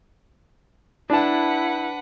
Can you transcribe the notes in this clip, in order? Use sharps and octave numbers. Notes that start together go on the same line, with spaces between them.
D4 E4 B4 F#5 A5